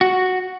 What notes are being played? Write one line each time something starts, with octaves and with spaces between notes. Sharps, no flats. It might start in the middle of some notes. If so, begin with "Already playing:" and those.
F#4